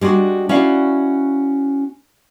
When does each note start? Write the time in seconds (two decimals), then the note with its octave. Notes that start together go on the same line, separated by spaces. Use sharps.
0.01 G3 G#3 D4 F#4
0.49 C#4 E4 F#4 D5 F5